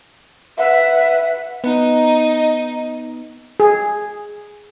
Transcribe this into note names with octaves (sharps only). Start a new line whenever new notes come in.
B4 E5 F#5
B3 D#4
G#4